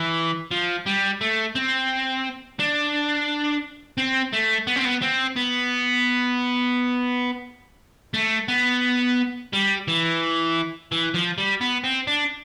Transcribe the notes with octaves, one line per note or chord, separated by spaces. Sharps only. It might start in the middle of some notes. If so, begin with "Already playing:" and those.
Already playing: E3
F3
G3
A3
C4
D4
C4
A3
B3
C4
B3
C4
B3
A3
B3
G3
E3
E3
F3
G3
B3
C4
D4